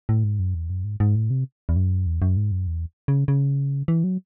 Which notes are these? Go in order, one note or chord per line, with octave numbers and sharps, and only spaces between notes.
A2
G#2
F#2
E2
F#2
G#2
G#2
A2
C3
E2
F#2
E2
F#2
G#2
F#2
E2
C#3
C#3
E3
F#3